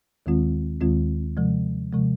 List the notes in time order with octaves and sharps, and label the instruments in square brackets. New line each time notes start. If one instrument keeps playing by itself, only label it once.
[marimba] D#2 D#3 G#3 C4 F4
D#2 D#3 G#3 C4 F4
C3 F3 G#3
C3 F3 G#3